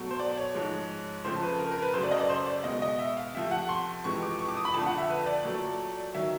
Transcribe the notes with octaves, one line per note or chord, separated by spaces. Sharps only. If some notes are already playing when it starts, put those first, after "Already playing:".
Already playing: B2 F#3 A3
C5
D5
C#5
G#2 F3 G#3
F2 C#3 F3 A3 C5
B4
A#4
A#4
B4
F#2 C#3 F#3 A3 C5
D5
D#5
D5
C5
D5
B2 G#3 D#5
D#5
E5
F5
C3 F3 A3 E5
F#5
C6
F2 C3 E3 G#3 C#6
D6
C#6
D6
D#6
B5
F2 D3 F3 A3 A5
F#5
E5
B4
D5
A#2 F#3 A3
D#3 F#3 E5